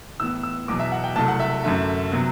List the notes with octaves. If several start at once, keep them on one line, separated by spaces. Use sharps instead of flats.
A2 E3 B3 E6
E6
E2 B2 F#3 D6
E5
F#5
G5
C2 C3 F#3 A3 A5
F#5
E5
F#2 D3 A3 E5
C3 F#3 B3